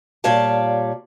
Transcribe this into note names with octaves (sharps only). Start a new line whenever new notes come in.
A#2 G3 F4 C#5 D5 A5